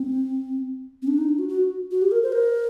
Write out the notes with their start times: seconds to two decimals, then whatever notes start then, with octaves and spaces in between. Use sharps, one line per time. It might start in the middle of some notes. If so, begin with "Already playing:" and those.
Already playing: C4
1.02 C4
1.08 D4
1.18 D#4
1.29 D4
1.39 F#4
1.49 F#4
1.91 F#4
2.02 G4
2.12 A#4
2.23 C5
2.32 A#4